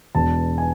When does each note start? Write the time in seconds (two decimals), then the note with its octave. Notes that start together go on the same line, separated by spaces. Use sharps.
0.15 E1 E2 B2 A5
0.58 G#5